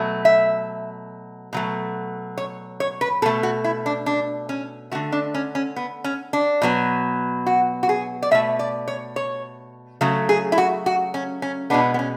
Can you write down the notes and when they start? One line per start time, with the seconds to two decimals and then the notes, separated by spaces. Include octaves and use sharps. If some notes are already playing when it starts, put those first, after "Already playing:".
Already playing: B2 F#3 A3
0.25 E5
1.53 B2 F#3 A3
2.38 C#5
2.80 C#5
3.01 B4
3.22 B2 A4
3.26 A3
3.43 F#4
3.64 E4
3.86 D4
4.06 D4
4.49 C#4
4.92 A3 F#4
4.95 D3
5.12 D4
5.34 C#4
5.55 C#4
5.76 B3
6.04 C#4
6.33 D4
6.62 B2 F#3 B3
7.46 F#4
7.83 F#4
7.89 G#4
8.22 D5
8.31 B2 A3 E5
8.59 D5
8.88 C#5
9.16 C#5
10.01 C#3 F#3 A3
10.29 G#4
10.52 E4
10.58 F#4
10.86 F#4
11.14 C#4
11.42 C#4
11.70 B2 G#3 B3 D4
11.94 B3
11.99 C#4